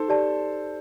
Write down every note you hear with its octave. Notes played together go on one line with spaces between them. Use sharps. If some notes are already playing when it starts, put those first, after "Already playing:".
Already playing: D#4 A4 C5
G4 D5 A5